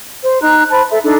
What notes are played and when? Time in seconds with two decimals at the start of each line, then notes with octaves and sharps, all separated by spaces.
0.22 C5
0.42 D#4 A#5 F#6
0.71 C5 A5 B5
0.90 A4 E5
1.04 D4 D#4 A4